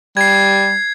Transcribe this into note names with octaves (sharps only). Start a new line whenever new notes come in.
G3 G#6 C7